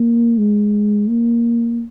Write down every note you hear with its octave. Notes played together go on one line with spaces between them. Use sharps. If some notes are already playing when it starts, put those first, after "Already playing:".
Already playing: A#3
G#3
A#3